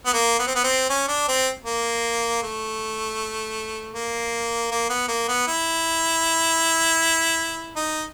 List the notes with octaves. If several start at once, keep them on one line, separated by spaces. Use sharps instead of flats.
B3
A#3
B3
C4
B3
C4
C#4
D4
C4
A#3
A3
A#3
A#3
B3
A#3
B3
E4
D#4